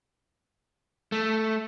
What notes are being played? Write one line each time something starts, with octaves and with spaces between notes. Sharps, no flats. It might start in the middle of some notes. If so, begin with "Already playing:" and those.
A3